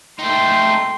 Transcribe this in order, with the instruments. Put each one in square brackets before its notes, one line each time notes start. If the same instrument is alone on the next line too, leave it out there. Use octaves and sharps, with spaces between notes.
[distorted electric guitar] A3 D#4 [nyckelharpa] G5 C6